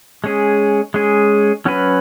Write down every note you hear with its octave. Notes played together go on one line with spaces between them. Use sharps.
G#3 C#4 G#4
G#3 C#4 G#4
F#3 C#4 F#4 B4